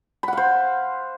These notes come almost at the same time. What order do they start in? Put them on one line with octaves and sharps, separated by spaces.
B5 F#5 F5 C5